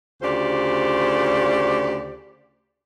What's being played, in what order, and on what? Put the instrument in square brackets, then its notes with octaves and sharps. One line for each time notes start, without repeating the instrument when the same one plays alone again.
[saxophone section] D2 C#3 F4 G4 C5 D5